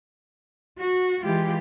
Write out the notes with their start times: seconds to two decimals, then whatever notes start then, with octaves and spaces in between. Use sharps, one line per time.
0.79 F#4
1.24 E3 G#3 F4 G4